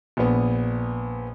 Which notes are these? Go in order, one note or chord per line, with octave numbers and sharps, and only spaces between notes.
A#1 B3